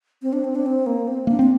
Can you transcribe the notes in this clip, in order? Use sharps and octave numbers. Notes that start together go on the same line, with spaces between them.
C4
D4
C4
D4
C4
A#3
C4
A#3 D4
C4 D4